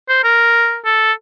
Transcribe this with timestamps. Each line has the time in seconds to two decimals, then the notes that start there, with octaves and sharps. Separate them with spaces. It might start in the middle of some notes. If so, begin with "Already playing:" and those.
0.09 C5
0.24 A#4
0.85 A4